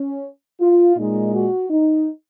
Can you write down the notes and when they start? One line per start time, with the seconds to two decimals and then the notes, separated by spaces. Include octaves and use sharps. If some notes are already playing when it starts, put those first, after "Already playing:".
Already playing: C#4
0.60 F4
0.96 A#2 G#3 D#4
1.33 F#4
1.69 D#4